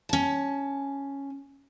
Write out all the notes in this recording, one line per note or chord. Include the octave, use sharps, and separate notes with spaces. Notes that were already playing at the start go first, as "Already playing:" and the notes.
C#4 A5